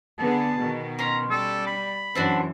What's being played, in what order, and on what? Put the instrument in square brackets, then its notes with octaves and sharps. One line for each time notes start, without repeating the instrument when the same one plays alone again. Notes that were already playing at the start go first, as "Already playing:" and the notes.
[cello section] D3 B3 G#4 [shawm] A5
[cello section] B2 D#3
[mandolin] C#4 C6 [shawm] A#5
[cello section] G3 [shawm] A4
[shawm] B5
[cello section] F#2 E3 [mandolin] C4 D4 F#4